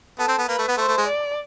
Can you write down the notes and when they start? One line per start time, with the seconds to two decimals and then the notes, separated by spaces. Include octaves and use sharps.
0.18 B3 A4
0.28 C4
0.38 B3
0.49 A#3 B4
0.59 A3
0.68 B3
0.77 A3 C5
0.88 A3
0.98 G#3
1.07 D5